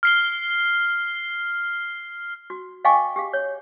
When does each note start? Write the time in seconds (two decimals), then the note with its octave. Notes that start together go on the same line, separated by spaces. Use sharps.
0.03 F6 C7 G7
2.50 F#4
2.84 D#5 F5 G5 G#5 C#6 D6
3.16 G4 G#4 F5
3.33 C#5